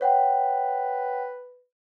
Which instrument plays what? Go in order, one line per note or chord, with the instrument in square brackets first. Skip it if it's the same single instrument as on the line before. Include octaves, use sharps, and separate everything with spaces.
[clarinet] B4 [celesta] C#5 F#5 G5